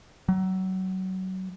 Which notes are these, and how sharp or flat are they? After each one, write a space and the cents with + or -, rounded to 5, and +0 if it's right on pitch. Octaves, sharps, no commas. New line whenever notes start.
F#3 +25